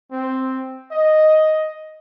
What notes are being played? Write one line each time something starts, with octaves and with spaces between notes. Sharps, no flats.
C4
D#5